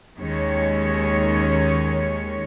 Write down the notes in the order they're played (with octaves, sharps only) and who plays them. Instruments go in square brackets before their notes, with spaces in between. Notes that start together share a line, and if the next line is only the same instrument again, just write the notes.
[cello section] D#2 D#3 G#3 C#4 C#5